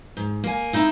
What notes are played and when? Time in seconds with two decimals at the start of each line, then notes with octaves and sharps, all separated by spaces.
0.17 G#2
0.44 A#3 G#5
0.73 C4 D#4 E4